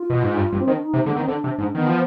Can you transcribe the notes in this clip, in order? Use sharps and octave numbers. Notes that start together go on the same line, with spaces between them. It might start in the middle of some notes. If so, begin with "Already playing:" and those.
Already playing: F4
B2
G#2
G2
G2
C4
D#3
D4
D#4
C3
D3 G#3
B3
D#3
C4
D3 D4
C3
G#2
D#3 B3
F3